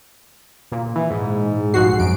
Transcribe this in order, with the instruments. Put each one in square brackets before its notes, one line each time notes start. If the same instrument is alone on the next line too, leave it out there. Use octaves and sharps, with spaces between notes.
[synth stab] A#2
[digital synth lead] E3
G#2
[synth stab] A#1 G#2 F#4 [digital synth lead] C7
[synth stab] F#2 [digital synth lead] D7